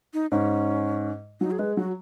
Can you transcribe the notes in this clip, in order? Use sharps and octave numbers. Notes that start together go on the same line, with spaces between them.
D#4
G#2 C#4
F#3 D#4
G#4
G#3 B4
F#3 F#4